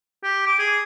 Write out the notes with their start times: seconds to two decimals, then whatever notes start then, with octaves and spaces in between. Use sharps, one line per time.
0.23 G4
0.47 D6
0.59 G#4